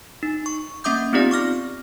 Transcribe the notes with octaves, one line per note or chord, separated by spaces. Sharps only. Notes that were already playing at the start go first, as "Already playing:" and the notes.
D#4
C#6
A#3 C#4 E5 D6 D#6 G6
B3 C4 D#4 F4 G4 D5
C#6 D6 F6 A#6